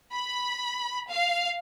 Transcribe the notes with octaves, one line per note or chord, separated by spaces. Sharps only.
B5
F5